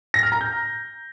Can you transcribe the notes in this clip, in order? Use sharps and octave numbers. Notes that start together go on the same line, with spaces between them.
A#6
F6
A#5
G6